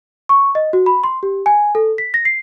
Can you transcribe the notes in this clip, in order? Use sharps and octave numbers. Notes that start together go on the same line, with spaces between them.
C#6
D#5
F#4
B5
C6
G4
G#5
A4
B6
A#6
C7